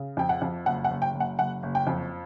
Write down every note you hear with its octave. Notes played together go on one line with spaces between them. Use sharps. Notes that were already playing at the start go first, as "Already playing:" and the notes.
Already playing: C#3
F2 G5
F#5
F2
F#1 F#5
F#5
F#1
G5
F#1
F#5
F#1 F#5
F#1
G5
F2